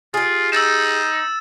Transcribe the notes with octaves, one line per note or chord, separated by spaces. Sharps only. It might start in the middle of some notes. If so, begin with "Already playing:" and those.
F4 G4 G#4
D#4 E6 A6 E7